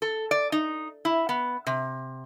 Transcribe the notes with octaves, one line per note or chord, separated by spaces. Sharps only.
A4
D5
D#4
E4
B3
C3